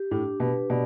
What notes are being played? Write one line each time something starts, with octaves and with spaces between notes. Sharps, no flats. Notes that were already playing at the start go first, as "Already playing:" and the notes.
Already playing: G4
A2 D4
B2 B4
B2 D5